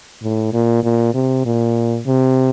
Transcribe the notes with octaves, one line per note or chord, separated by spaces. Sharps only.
A2
A#2
A#2
C3
A#2
C3